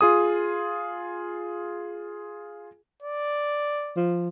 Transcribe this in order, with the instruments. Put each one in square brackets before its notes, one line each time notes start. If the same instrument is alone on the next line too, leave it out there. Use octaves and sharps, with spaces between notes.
[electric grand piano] F4 G#4 D#6
[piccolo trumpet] D5
[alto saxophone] F3